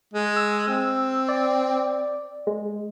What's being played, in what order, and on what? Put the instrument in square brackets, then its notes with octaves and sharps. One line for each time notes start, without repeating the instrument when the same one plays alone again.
[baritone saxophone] G#3
[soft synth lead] E6
[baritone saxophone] C4 [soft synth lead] E6
[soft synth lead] D5
G#3